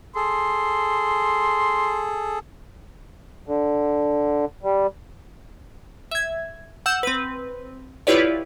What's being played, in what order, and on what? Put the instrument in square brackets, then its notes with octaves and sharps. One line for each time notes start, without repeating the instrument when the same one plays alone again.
[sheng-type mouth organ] G#4 A4 [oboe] C6
[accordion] D3
G3
[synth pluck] E5 G#6
F#5 E6 G6 E7
C4 B4
E4 F4 G4 B4 C#5 D5